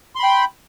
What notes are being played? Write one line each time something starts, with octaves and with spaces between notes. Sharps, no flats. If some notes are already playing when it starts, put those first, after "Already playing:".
G5 B5 C6